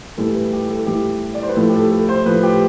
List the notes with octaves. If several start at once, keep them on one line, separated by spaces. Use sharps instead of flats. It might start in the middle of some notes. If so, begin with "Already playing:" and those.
A2 E3 G3 A4
B4
G4
A4
A2 E3 G3 G4
D5
C5
B4
A2 F3 A4
G4
A4
A4
C5
A2 F3 B4
G4